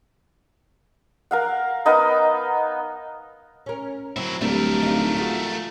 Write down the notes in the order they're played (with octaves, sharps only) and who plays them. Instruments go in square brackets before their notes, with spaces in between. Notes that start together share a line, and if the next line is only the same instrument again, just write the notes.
[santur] A#4 F5 F#5
B3 D#4 A#4 D#5
[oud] C#4 A#4
[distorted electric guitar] F#3 E4 [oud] C4
[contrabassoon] D1 [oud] G3 G4 [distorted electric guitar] A3 A#4
[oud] D#4 F4
F4 F#4 G#4